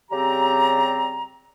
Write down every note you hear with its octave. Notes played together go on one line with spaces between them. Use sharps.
C#3 G3 C4 G4 D5 A#5